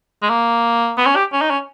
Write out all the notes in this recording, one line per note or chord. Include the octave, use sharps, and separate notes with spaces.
G#3
A#3
B3
C#4
G4
C#4
D#4
C#4